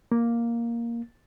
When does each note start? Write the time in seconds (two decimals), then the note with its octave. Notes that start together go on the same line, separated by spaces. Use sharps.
0.12 A#3